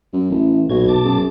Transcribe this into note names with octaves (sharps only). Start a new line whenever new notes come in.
F#2
A1 E3
B1 A#2 F#4 G#6
B2 A5 D6
F#2 G#4